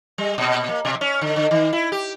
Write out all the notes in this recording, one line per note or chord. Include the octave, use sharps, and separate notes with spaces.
G3
A#2
A#3
B2
C#4
D3
D3
D#3
E4
G4